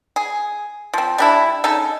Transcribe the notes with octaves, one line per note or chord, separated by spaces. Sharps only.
G#4
F3 C4
G3 D4 E4
C#3 D#4 A4